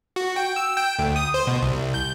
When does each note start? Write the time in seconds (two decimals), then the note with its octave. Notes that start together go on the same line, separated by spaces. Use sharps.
0.16 F#4
0.36 G5
0.56 E6
0.76 G5
0.99 D2
1.16 D#6
1.34 C5
1.47 B2
1.62 C2
1.94 G6